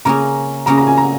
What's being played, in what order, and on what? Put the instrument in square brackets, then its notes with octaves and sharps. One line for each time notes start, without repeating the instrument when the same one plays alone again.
[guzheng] C#3 A#3 C#4 [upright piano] A#5
[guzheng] C#3 A#3 C#4 [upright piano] A#5
[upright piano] A#5
G#5
A#5